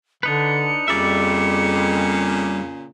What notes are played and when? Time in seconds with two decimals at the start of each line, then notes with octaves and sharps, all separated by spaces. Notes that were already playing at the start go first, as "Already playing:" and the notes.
0.23 D3 D4 D#4 B4 C#7
0.88 F2 A#2 C#3 G3 D5 E5